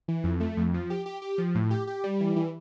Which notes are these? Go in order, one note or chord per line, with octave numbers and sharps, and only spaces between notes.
E3
F2
A3
F2
F3
G4
G4
G4
F3
A2
G4
G4
G3
E3
E3